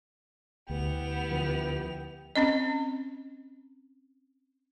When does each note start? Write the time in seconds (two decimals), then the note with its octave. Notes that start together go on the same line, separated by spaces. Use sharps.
0.70 D2 B3 E4 G4 G5 F7
1.31 D3 F3
2.36 C4 C#4 D#5